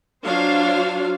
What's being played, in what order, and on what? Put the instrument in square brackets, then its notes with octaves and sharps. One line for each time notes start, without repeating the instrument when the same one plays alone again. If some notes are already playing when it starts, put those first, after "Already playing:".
[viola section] F#3 D4 F4 F#4 C5 F5